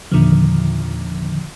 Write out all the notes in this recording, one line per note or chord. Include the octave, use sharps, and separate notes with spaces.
E2 A#2 D3 D#3 F3